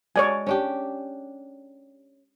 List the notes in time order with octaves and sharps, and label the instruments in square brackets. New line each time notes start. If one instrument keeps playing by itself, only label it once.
[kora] G#3 [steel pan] C#5 D5 G#5
[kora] C#4 D4 G4